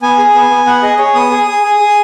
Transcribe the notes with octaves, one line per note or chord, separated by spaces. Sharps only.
B3 G#5
G#4
B3
B3
B3 F#5
G#4 D#5
G#4 C#5
B3 D#6
G#4
G#4
G#4
G#4